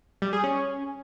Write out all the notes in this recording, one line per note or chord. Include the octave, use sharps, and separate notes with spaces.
G3
G#4
C#4